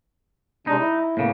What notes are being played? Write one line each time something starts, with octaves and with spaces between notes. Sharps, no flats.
C3 G#3 D4 D#4
E4
A2 C#3 A#3 B3